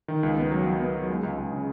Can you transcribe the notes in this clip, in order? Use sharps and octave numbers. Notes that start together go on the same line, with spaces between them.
D#3
C#2
B3
F#3
F#3
B3
F#3
G#3
C#2
C#2
C#3